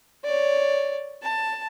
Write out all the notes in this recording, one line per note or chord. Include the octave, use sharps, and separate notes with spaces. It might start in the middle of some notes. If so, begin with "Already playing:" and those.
C#5 D5
A5